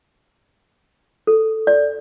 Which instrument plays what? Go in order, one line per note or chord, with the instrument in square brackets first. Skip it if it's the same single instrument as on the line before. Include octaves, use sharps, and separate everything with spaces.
[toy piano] A4
D5